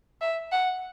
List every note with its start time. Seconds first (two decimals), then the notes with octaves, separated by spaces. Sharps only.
0.21 E5
0.52 F#5